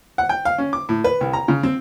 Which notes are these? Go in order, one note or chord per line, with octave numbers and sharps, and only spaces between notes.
F#5
G5
F5
C#4
D6
A2
B4
C2
A#5
C#3
C4